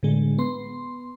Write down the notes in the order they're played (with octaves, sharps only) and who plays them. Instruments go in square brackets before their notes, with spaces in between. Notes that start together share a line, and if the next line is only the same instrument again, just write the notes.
[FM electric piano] A2 D3 G#3
B3 C6